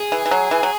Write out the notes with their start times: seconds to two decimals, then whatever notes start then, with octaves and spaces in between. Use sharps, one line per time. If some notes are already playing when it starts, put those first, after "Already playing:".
Already playing: G#4
0.12 E3
0.26 E3
0.31 F#3
0.51 E3
0.63 F#3